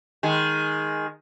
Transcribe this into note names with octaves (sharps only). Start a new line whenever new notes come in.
D#3 G#3